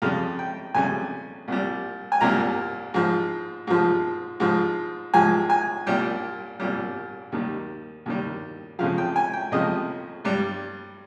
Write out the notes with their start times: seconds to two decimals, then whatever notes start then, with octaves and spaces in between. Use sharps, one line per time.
0.02 F2 C#3 G3 F5
0.39 G5
0.75 F2 C#3 G3 G#5
1.48 C2 A#2 G3
2.12 G#5
2.21 C2 A#2 G3 A#5
2.94 G#2 F3
3.67 G#2 F3
4.40 G#2 F3
5.14 G#2 F3 G#5
5.50 G#5
5.87 C2 A#2 G3 G5
6.60 C2 A#2 G3
7.32 D#2 D#3 G3
8.06 D#2 D#3 G3
8.79 F2 C#3 F3 F5
8.98 G5
9.16 G#5
9.33 G5
9.52 F2 C#3 F3 D#5
10.25 G2 G3